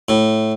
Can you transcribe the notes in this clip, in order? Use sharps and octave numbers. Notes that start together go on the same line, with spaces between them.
A2